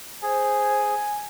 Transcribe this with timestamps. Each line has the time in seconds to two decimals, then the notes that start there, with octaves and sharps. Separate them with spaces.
0.23 G#4 C5 G#5